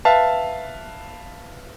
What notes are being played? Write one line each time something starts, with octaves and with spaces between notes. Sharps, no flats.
B4 E5 F5 A5